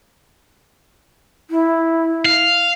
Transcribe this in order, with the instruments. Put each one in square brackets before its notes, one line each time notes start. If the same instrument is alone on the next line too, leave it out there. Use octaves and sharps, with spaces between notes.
[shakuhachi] E4
[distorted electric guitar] F5